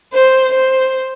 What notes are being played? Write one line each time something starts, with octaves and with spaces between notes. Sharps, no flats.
C5
C5